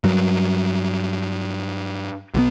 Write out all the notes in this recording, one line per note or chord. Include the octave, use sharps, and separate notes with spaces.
G2 F#3
B1 E3 B3